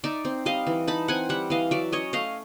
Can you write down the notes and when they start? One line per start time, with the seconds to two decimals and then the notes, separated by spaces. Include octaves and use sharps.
0.04 D#4 D5 E5
0.25 C4
0.45 G3 D#5 F5
0.67 E3
0.87 D#4 A5 B5
1.08 C4 F#5 G#5
1.29 G3 E5 F#5
1.50 E3 D#5 F5
1.71 F#3 D5 E5
1.92 C#4 C#5 D#5
2.13 A3 D#5 F5